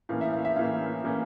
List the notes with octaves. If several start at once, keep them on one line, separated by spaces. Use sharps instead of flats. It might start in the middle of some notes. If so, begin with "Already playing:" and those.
A2 E3 A#3 C#4 F5
E5
F5
E5
A2 E3 A#3 C#4 F5
A2 E3 A#3 C#4